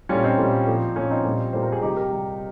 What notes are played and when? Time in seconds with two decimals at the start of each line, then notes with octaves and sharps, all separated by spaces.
0.09 A#2 G3 C#4 F4
0.24 C4 D#4
0.38 A#2 G3
0.67 A#2 F3
0.96 A#2 F3 C#4
1.10 C4 D#4
1.24 A#2 G3
1.53 A#2 G3 C5
1.63 A#4
1.72 G#4
1.82 C3 G3 D#4 G4
1.97 G4 A#4
2.11 C3 G3